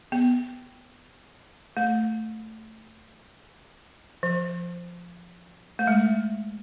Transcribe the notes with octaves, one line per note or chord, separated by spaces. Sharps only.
B3
A3
F3
A3
G#3